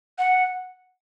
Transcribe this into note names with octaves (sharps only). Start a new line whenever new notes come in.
F#5